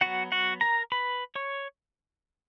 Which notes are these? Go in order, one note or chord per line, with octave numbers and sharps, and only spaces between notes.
F#3 B3 F#4 F#5
F#4 F#5
A#4 A#5
B4 B5
C#5 C#6